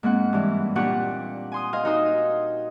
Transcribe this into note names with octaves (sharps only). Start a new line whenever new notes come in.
G#2 A#3 C4 F#5
G2 E3
A#2 D4 G4 F#5 C#6
G#5 C6 D#6
C5 D#5 F5 G#5
D#4 F#4 A#4 C5 D#6